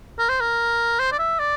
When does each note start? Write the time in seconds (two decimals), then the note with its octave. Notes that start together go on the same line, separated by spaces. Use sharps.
0.19 A#4
0.29 C5
0.41 A#4
1.00 C5
1.12 D5
1.19 E5
1.39 D5